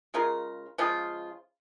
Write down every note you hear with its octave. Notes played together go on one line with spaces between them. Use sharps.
C#3 G#3 F4 A#4
C#3 F3 G#3 F4